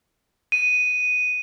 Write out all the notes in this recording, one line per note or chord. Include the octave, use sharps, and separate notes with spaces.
D#7